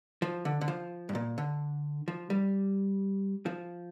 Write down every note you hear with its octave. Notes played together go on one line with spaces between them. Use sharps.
F3
D3
D3
F3
G2
A#2
D3
F3
G3
F3